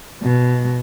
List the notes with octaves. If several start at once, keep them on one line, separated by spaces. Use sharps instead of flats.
B2